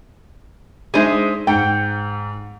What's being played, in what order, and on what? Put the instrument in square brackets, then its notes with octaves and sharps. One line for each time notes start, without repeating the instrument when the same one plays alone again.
[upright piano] G#3 D4 D#4 [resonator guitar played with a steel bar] G#4 C5 E5
[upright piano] G#2 [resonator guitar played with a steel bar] F#5 G5